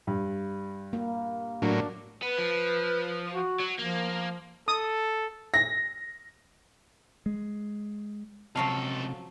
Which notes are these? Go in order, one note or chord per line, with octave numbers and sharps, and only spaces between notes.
G2
A#3
A2 F#3 A#3 D4
B3 B4
F3
F#4
F#3
F3 A#3
A4 D#6
A#6
G#3
C#2 C3 F3 F#3 A4 F5 A5